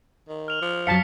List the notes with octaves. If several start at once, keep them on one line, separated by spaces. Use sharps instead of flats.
D#3
F6 F7 F#7
F3
F#2 F#3 F5 A5 B6 C#7